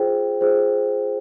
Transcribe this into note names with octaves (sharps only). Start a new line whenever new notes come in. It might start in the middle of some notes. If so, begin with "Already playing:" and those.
Already playing: F4 G#4 C5 G5
F4 G#4 C5